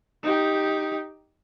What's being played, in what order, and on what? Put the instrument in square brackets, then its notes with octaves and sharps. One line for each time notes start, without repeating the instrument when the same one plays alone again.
[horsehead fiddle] D#4 G4